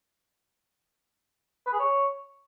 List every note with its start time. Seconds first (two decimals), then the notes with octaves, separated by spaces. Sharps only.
1.66 B4
1.73 G#4
1.79 C#5